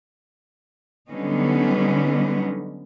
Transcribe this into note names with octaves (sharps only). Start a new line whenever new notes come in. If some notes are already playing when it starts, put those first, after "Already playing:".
D3 F#3 G3 B3 C#4 D#4